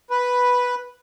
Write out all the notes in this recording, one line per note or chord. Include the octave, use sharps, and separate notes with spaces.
B4